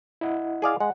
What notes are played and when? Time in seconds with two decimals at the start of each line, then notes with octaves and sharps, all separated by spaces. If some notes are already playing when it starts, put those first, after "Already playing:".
0.21 E4 D#5 F#5
0.62 G#4 D5 F5
0.80 G#3 F#5